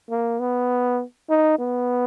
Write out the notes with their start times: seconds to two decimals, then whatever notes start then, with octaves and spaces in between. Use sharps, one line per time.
0.10 A#3
0.40 B3
1.30 D#4
1.59 B3